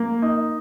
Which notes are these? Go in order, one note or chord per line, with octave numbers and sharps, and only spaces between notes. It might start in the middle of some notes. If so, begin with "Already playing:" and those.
Already playing: A#3
D#4